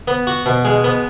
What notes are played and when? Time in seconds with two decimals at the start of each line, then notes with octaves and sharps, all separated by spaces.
0.08 B3
0.27 F#4
0.46 B2
0.65 G#3
0.84 B3